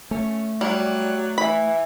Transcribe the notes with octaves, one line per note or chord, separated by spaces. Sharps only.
A3 C#4
F#3 G3 D5
E3 B5